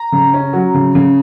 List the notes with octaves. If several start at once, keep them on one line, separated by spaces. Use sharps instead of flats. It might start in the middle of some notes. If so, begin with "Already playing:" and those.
Already playing: A#5
C#3
C#4
F#3
C#3
C#3